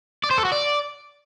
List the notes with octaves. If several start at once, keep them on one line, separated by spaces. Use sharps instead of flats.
D5
C5
A4
F#4
D5